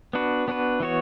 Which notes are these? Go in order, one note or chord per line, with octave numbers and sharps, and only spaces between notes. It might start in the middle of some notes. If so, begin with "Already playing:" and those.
B3 D4 F#4 B4
B3 D4 F#4 B4
E3 B3 F#4 C#5